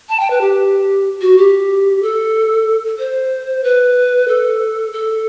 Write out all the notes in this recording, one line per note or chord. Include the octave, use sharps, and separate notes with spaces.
A5
G5
B4
G4
F#4
G4
A4
C5
B4
A4
A4